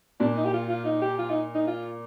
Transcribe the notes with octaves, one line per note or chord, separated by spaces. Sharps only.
A#2 D4
D#4
G4
F4
F4
D#4
G4
F4
D#4
D#4
F4